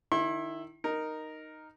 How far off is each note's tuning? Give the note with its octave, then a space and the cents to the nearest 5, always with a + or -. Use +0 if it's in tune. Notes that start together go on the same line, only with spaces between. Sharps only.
D#3 -25 E4 +0 C6 +45
D#4 -5 A#4 +0